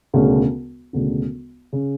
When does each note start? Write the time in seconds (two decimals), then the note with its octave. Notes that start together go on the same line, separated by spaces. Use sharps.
0.13 E1 D2 C#3
0.93 E1 D2 C#3
1.73 C#3